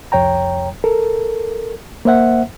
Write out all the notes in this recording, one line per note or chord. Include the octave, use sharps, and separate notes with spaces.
C2 F2 C#5 G5 A#5
A4 A#4
A#3 C5 E5 F#5